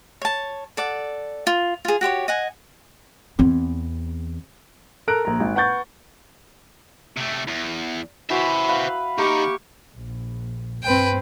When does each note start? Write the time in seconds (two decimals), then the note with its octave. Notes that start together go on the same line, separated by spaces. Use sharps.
0.22 C#5 A5
0.77 A4 D5 F#5
1.47 F4
1.85 F4 G#4
2.01 F#4 G4 C5 C#5
2.28 D#5 F#5 G#5
3.39 E2 C4
5.08 A4 A#4 A#5 F#6 D7
5.25 A#1 A#5
5.40 G#1
5.55 B4 F#5 C#6 G6 A6
7.17 C3 A3
7.48 E2
8.30 E3 F#4 C5 E5
8.69 B4 F5
9.18 D#3 A#3 G4 C#6
9.95 A#1
10.83 G2 C4 B4 G5